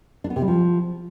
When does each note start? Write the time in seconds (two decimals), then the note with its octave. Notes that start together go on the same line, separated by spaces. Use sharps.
0.24 D4
0.30 B3
0.36 C3
0.42 G3
0.48 F3